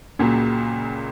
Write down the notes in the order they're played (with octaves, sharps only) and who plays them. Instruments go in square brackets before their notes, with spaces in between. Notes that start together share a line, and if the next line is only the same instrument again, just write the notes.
[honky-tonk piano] C#2 C#3 F#3 [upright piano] A#2